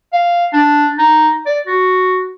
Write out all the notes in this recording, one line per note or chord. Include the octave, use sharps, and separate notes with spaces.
F5
D4
D#4
D5
F#4